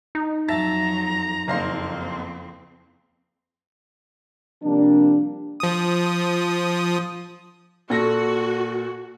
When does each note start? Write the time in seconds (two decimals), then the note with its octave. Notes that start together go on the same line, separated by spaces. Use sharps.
0.15 D#4
0.48 F2 F#3 E5 A5 A#5 A6
1.48 F#1 F2 C4 F5 C6
4.63 C3 F3 G3 A#3 D4
5.60 F3 D#6
7.90 A#2 F#4 A4 A#6